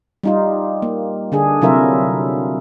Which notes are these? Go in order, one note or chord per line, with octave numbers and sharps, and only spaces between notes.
G3 D#4 F4
A#3
D3 D4 G#4
C3 F#3 E4 F4 A#4 E5